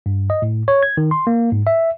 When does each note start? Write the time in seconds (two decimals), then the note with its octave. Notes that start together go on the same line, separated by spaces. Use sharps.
0.06 G2
0.30 D#5
0.42 A2
0.68 C#5
0.83 G#6
0.97 D#3
1.11 C6
1.27 A#3
1.52 G#2
1.67 E5